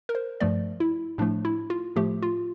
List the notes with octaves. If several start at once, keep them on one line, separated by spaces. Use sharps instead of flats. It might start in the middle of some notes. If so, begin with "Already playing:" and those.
A#4
C5
G2 F3 A3 D5
E4
A2 F3 A3 D4
E4
F4
A2 F3 A3 G4
F4